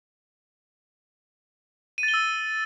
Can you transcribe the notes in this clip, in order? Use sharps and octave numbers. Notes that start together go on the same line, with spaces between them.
D#7
A6
G7
E6